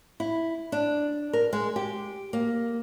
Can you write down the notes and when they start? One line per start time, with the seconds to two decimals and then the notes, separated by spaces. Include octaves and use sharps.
0.20 E4
0.72 D4
1.33 A#4
1.53 G#3
1.76 G4
2.33 A#3